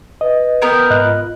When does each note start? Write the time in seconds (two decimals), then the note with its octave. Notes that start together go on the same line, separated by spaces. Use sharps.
0.21 B4 D#5
0.62 B3 A#4 G5
0.90 G#2 D#5 F#6
1.03 F4